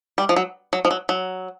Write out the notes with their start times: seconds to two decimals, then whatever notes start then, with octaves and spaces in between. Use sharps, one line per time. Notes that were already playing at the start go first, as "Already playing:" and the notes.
0.18 G3
0.29 F3
0.36 F#3
0.73 F#3
0.85 F3
0.91 F#3
1.09 F#3